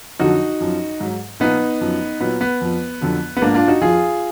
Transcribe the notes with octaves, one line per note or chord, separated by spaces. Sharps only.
F2 D3 F#3 D#4 F#4
F#2 F3
G#2 F#3
A#2 F3 B3 D#4
F#2 F3
A#2 F#3 B3
B3
F2 F3
F2 D3 F#3
B3
G#2 F3 A#3 D4
D4 F4
D#4 F#4
F2 F3 F4 G#4